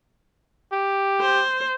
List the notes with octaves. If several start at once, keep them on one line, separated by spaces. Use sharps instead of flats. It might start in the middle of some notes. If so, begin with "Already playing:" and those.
G4
C5